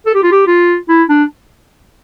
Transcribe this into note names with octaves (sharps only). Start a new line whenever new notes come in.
A4
G4
F4
G4
F4
E4
D4